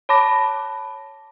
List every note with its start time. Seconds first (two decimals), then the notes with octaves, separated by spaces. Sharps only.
0.09 C#5 A5 B5 D6 A#6